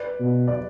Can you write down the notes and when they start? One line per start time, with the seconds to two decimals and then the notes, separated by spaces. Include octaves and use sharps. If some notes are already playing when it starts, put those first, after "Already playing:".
Already playing: B4 D5
0.20 B2
0.47 D5